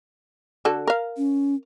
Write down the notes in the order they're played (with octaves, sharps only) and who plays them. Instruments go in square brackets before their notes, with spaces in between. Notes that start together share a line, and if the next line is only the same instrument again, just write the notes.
[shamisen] D3 F#4 A4
A#4 F5
[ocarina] C#4